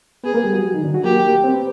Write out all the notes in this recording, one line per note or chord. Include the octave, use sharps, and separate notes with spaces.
B3 G#4 B4
A#3 A#4
G3 G4
F#3 F#4
D#3 D#4
D3 D4
F#3 F#4
A#3 G4 A#4
C4 C5
B3 B4